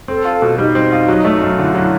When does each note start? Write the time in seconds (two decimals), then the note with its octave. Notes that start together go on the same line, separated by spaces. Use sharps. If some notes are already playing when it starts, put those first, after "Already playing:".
0.08 C4 A4
0.25 F4
0.42 B2
0.58 G3 D#4
0.75 C4
0.92 F4
1.08 F#3
1.25 A3
1.41 F#2
1.58 D3 E4
1.75 F#3